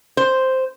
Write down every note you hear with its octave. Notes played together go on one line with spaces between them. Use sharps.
C5